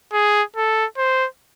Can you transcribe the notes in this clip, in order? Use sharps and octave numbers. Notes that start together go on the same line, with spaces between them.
G#4
A4
C5